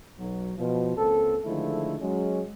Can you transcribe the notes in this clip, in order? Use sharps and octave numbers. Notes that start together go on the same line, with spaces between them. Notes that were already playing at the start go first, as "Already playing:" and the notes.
B1 F#3
B2 F3
C#2 A#3 C4 A4
D3 D#3 F3 G#3 A3 E4
F#3 G#3 C#4